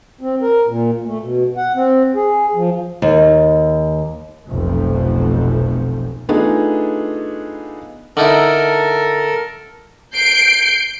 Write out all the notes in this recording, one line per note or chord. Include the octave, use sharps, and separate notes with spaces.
C4
A#4
A#2
A3
B2
F#5
C4
G#4
F3
D#2
F1 B1 F2 F3 A3
A3 B3 D4 D#4 F4 G#4
D3 D#4 E4 A4 A#4
G6 C7 D7